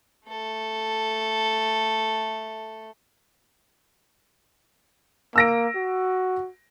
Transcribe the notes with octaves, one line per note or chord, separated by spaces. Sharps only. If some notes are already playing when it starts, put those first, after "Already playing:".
A3 A4
A#3 E6 A#6 D7
F#4